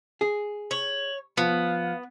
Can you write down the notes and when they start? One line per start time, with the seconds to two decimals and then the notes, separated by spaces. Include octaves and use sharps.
0.21 G#4
0.71 C#5 F#7
1.37 F3 B3 F5